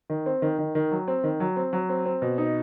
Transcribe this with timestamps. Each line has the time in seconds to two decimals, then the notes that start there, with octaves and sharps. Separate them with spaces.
0.10 D#3
0.26 C4
0.42 D#3
0.59 D#3
0.75 D#3
0.92 F#3
1.08 C4
1.24 D#3
1.40 F#3
1.56 C4
1.73 F#3
1.89 C4
2.06 C4
2.22 B2
2.38 D#4